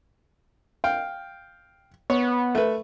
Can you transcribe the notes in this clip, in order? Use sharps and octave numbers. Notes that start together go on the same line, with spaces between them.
F5 G5
B3 C#5
A3 B4